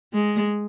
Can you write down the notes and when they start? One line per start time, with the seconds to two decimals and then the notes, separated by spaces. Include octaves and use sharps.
0.14 G#3